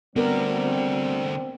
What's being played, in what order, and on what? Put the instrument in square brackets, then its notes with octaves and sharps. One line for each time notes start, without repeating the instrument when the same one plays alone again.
[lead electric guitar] D3 F#4 [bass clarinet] G3 [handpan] B3 A#4 [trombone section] C4